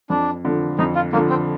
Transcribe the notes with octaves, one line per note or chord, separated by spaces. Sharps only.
F2 D4
D3 F3
F2 D#4
F4
D3 F3 A#3
C4